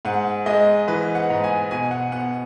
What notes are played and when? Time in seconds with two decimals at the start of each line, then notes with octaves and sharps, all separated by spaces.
0.05 G#2 F#5
0.46 G#3 D#5
0.88 E3 B4
1.15 F#5
1.30 G#2
1.44 G#5
1.71 B2 G#5
1.91 F#5
2.12 B3 F#5